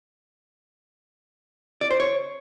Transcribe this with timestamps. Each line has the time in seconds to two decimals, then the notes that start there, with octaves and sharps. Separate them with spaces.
1.81 D5
1.91 C5
2.00 C#5